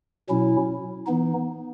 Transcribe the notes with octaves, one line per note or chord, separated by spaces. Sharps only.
B2 F#3 C#4 E4
E3 B3 D#4